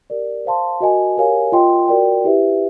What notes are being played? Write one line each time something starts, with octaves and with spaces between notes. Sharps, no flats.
G4 A#4 D5
C5 F5 A5 C6
F#4 A#4 D#5 G#5
G4 A#4 C#5 F5 G#5
F4 A#4 D#5 G5 C6
F#4 A#4 D5 G5
E4 G4 B4 E5